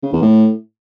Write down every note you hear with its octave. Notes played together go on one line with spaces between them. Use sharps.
C#3
E2
A2